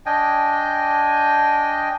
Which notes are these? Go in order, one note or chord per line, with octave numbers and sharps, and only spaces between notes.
D4 D#5 G5 G#5